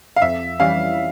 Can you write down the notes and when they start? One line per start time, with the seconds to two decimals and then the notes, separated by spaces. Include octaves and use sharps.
0.16 F5
0.22 F2 E5
0.60 E3 G3 C#4 F5